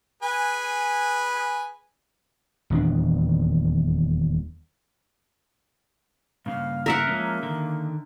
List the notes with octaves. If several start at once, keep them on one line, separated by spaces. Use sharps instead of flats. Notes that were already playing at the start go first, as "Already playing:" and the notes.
G#4 B4 G#5
D#1 E2 C#4 D4
G2 C#3 A#3 F5
A#4 E5 F#5
F3 G#3 A#3 C#4
D3 D#3